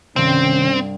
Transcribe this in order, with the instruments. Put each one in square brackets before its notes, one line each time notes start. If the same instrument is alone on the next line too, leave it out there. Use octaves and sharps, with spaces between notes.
[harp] C2 G2 [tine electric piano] C3 D#3 [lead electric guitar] C4 [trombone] C#4